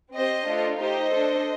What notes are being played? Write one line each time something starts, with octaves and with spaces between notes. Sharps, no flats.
C4 G4 C5 D#5
A3 D4 F4 A4
A3 D#4 G4 C5 D#5
D4 A4